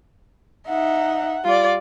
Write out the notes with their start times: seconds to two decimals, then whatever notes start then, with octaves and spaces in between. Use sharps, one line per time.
0.68 D#4 E5 F#5
1.44 G3 F4 D5